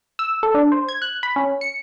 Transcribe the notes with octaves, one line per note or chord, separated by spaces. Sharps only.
E6
A4
D4
C5
G#6
F#6
B5
C#4
C#7